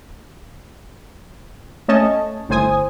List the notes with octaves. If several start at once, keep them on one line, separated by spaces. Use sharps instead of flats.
A3 C#4 C#5 D#5 A5
G1 A2 C5 G#5 D#6